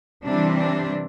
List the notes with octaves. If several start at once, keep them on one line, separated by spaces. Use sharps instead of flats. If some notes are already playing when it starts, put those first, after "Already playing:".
C3 E3 G3 C4 D4
D4